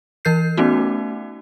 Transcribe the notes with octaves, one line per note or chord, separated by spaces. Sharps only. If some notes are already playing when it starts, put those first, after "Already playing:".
E3 A#4 G6 C7
A3 B3 C#4 D#4 F#4